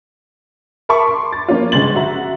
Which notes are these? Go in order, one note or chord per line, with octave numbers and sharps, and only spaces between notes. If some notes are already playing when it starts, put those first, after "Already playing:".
A#4 E5 A5 B5 C#6 D6
C6
A6
F3 A#3 C#4 F4
G1 C#3 G#3 C6 A6 F#7
F#4 E5 A#5